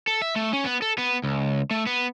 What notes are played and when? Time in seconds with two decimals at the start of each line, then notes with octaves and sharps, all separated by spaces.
0.07 A4
0.22 E5
0.36 A3
0.53 C#4
0.64 B3
0.82 A4
0.98 B3
1.24 C#2
1.71 A3
1.87 B3